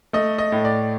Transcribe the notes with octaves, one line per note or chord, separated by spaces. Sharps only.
A3 D#5
D#5
A2
D5